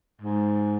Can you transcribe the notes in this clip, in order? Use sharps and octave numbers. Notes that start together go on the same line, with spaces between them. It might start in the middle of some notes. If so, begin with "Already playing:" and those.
G#2